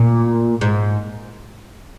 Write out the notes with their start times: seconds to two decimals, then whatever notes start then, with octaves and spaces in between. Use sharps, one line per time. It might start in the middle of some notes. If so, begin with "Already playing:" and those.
Already playing: A#2
0.61 G#2